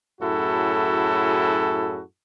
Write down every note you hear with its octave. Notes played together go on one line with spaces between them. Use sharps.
F#2 A2 E4 F#4 G#4 A4